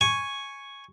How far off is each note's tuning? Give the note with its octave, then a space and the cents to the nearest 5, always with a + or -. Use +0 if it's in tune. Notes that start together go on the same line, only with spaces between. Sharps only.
G#5 +0 C#6 +0